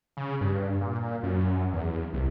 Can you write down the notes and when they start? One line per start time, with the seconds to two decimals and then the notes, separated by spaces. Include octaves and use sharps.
0.17 C#3
0.41 G2
0.81 A#2
1.23 F#2
1.73 E2
2.13 C2